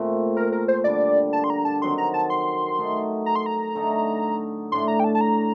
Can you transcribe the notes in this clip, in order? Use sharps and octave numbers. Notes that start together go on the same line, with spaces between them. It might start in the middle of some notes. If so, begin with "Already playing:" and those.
Already playing: A#2 A3 C4
A#4
A#4
C5
D3 G3 D4 D5
A5
C6
A#5
A5
D#3 F#3 C4 C6
A#5
A5
C6
A3 D#4 A4
A#5
C6
A#5
D3 A3 D#4 A4
A2 A3 D4 C6
A#5
G5
A5
A5
A#5